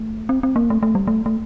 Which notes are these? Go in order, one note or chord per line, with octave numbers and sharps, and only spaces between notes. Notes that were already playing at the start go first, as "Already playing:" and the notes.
Already playing: A3
C4
C4
A#3
A3
A3
G3
A3
A3